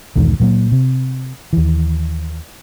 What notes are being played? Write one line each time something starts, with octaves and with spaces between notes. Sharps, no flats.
B1 E2 G#2 D#3
A#2 F#3 A#3
C3
D#2 E3